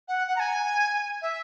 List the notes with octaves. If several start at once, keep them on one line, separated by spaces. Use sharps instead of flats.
F#5
F#5
A#5
G#5
E5